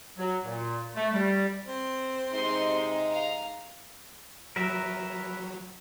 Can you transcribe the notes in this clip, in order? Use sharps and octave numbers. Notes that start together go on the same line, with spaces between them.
F#3
A#2
A3
G3
C4
C3 G#3 D#4 C6
F5 A#5
F#3 A#4 B4 E5